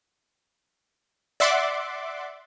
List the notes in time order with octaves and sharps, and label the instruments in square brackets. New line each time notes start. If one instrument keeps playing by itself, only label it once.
[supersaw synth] D5 E5 F#5 C6 D6